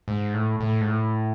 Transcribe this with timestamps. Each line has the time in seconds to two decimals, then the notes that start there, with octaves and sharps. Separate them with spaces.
0.08 G#2
0.34 A2
0.60 A2
0.81 G#2
0.87 A2